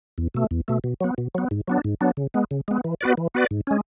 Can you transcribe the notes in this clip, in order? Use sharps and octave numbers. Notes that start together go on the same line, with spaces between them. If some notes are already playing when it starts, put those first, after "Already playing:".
E2
B2 A3
E2
B2 A3
B2
F#3 B3
B2
F#3 B3
G#2
F#3 B3 D4
G#2
F#3 B3 D4
C#3
G#3 B3
C#3
G#3 B3
E3
B3 F#4 B4 D5
E3
B3 F#4 B4 D5
G#2
G#3 C#4